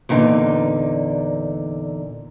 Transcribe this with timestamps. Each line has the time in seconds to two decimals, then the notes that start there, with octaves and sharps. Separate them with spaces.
0.09 E2 A#2 D3 D#4